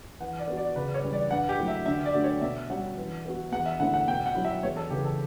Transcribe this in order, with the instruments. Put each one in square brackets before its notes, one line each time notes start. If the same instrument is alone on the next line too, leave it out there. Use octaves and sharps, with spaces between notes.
[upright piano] E3 [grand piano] F#5
[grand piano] D5
[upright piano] B3 F#4
[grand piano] D5
[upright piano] C#3 [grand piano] B4
[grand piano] C#5
[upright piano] E3 G3 C#4
[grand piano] D5
[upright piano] G2 [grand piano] F#5
[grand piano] G4
[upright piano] F#3 A3 E4
[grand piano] E5
[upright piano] D3 [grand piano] E5
[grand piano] D5
[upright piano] A3 D4 F#4
[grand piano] C#5
[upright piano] B2 [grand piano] E5
[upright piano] G3 C#4 F#4 [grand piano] F#5
[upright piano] E3
B3 F#4
[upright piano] E2 [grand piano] F#5
[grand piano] E5
[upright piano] D3 A3 C#4 E4 [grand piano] F#5
[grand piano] F#5
[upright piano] B2 [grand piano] G5
[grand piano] F#5
[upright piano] F#3 C#4 E4
[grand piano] E5
[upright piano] E2 [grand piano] C#5
[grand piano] A4
[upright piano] C#3 E3 [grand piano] G4
[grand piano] A4